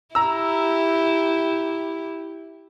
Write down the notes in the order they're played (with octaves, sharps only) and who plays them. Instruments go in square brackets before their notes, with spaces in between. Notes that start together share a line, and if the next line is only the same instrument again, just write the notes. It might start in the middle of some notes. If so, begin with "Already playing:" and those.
[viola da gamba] E4 G4 [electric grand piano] A#5 E6